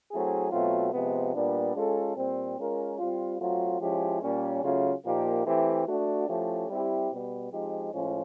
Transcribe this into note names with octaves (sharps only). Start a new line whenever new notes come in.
F#3 A3 C4 E4 G#4
B2 F#3 A3 C4 F4
C3 F3 G#3 B3
A#2 G3 B3 D4
G#3 C#4 F4 A4
A#2 G3 C4
G#3 C#4 F4 A#4
G3 C4 F4
F#3 A3 C4 F4
F3 G#3 C#4 E4 G4
A#2 G3 A#3 C#4
C#3 F#3 A3 C#4 F4
A#2 F3 A#3 D#4 G4
E3 A3 C4 E4 G4
A3 D4 F#4
F3 A3 C#4 E4 G4
G3 C4 E4 G4
B2 G3 B3
F3 G#3 C4 D#4 G4
A2 F3 G#3 C#4